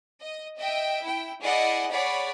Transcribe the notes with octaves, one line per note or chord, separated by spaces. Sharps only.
D#5
D#5 E5 G5
E4 G5
E4 G#4 D5 D#5 F#5
G#4 C#5 D5 F#5 B5